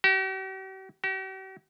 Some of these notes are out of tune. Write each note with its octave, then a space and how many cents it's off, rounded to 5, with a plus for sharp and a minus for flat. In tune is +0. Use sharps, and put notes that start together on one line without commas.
G4 -45
G4 -45